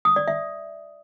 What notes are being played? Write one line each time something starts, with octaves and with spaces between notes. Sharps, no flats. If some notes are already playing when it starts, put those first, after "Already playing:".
D#6
D5
E5